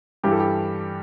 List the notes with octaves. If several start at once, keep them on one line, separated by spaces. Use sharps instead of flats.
G2 E3 G3 G4
A4
G4